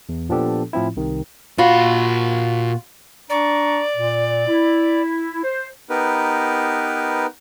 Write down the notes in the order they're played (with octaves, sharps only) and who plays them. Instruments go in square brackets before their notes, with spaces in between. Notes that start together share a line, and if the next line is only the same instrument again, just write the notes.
[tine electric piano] E2
A#2 F3 B3 D4 G4 A4
A2 F3 C4 E4
C2 C3 D#3
[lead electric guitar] A#2 B5 [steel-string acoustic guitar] F4 F#4
[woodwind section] D4 A#5 C#6 [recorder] D5
[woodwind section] A#2
E4
C5
[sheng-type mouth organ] B3 D#4 G4 A#4 B4